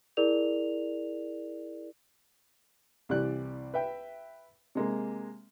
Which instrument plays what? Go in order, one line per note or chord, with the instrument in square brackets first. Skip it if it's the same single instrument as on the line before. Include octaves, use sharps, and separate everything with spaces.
[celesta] E4 G#4 A#4 D5 F7
[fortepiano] C2 E3 G3 D5 F#6
B4 E5 G5
C3 G#3 A#3